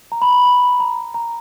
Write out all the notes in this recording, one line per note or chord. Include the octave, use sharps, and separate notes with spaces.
A#5
B5
A#5
B5
A#5
A#5